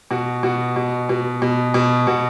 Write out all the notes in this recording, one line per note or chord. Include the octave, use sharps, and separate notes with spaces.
B2 F#4
B2 F#4
B2
B2
B2
B2
B2 F#4